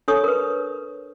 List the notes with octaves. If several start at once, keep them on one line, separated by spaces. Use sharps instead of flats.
D4 A4 C#5 C#6 D#6
A#4 B4